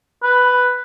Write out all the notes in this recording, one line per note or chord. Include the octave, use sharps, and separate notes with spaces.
B4